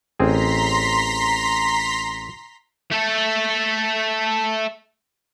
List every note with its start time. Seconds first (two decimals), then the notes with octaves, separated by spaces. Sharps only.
0.20 A1 C4 G#4 A#5 C6 B6
2.92 A3 A4